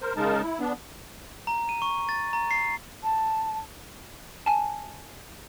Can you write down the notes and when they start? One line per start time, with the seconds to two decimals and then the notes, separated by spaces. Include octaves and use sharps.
0.02 A#4 C5
0.17 C#3 G#3 D#4 A#4 A5
0.43 E4
0.60 B3 D4
1.47 A#5
1.69 D#7
1.82 C#6
2.09 A6
2.33 A#5
2.51 C7
3.03 A5
4.46 G#5 A5